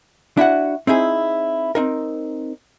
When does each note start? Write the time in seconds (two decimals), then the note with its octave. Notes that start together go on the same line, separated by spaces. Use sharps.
0.37 D4 E4 F#4 F#5
0.87 C4 D#4 E4 G#4
1.75 C4 D#4 A#4